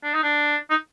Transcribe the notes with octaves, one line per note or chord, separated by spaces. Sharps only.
D4
D#4
D4
D#4